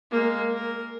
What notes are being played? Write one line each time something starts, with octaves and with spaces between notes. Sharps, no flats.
G#3 A#3
A#4